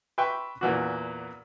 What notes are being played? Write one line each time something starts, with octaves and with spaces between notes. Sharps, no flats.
B4 E5 G5 C6 C#6
E2 A#2 E3 F#4